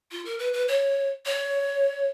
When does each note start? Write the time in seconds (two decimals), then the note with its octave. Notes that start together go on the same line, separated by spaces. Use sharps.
0.11 F4
0.25 A#4
0.39 B4
0.53 B4
0.68 C#5
1.26 C#5